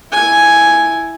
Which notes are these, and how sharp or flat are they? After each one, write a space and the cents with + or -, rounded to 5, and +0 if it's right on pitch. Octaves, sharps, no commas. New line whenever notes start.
E4 +0 G#5 +0